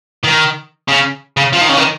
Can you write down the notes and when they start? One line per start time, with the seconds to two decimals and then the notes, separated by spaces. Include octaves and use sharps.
0.24 D#3
0.88 C#3
1.37 C#3
1.53 F3
1.61 D#3
1.69 C#3
1.77 D#3